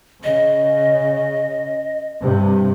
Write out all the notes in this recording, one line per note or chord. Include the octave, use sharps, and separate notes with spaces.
C#3 D#5
G2 C3